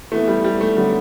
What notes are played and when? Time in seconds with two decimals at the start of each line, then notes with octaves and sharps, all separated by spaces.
0.12 E3 A3 B3 E4
0.28 G3
0.44 G3
0.61 A3
0.77 D3 F#3 G3 B3 D4